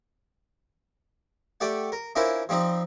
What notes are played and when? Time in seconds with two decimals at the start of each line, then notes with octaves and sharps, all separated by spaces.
1.61 A3 G4 D5 F#5
1.92 A#4
2.16 C#4 D4 E4 F4 A#4 C5
2.49 F3 G3 C4 D#4